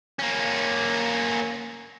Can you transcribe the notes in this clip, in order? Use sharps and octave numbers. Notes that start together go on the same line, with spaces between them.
A#3 C#4